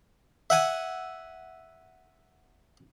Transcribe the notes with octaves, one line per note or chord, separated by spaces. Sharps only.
E5 F#5 G#5